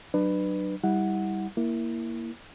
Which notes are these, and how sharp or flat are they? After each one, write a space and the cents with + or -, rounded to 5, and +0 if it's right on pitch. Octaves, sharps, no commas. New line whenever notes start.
F#3 +20 D4 +35 B4 +0
G3 +0 E4 -30 F#5 -5
A#3 +5 E4 +0